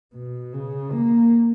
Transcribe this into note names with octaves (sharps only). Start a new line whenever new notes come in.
B2
C#3
A#3